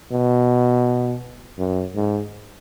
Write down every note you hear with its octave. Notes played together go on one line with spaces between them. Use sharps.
B2
F#2
G#2